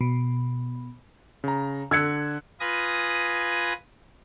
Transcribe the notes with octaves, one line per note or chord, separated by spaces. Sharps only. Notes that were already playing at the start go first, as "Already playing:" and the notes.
B2
C#3 A#5
D3 E6 F#6 G#6 C#7
F4 B4 G#5 D#6 A#6